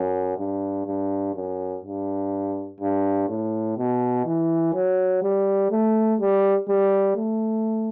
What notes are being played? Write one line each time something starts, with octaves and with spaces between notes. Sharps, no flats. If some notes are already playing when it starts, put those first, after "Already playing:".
Already playing: F#2
G2
G2
F#2
G2
G2
A2
B2
E3
F#3
G3
A3
G3
G3
A3